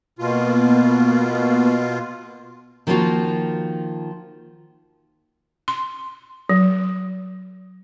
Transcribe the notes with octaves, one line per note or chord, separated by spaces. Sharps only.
B2 A#3 B3 F4
D#3 F3 A#3 C#4 F4 F#4
C6
F#3